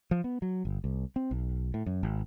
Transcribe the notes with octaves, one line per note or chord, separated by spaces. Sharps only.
F3
B3
F#3
G1
C2
C4
B1
A2
F#2
G#1